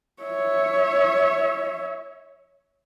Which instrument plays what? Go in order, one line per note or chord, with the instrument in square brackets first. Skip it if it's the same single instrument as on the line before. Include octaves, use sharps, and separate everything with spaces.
[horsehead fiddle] C#5 E5